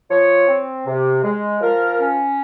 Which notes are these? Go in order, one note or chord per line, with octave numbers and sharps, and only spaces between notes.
F3 C#5
C4
C3
G#3
F3 A#4
C#4